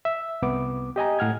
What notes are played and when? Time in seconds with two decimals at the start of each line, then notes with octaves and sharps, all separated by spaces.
0.05 E5
0.42 C2 B3 D6
0.96 G4 D#5 G#5 A#5
1.19 A2 F#5 F6 G#6